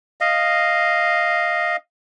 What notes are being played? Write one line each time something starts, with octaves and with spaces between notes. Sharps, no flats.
D#5 F5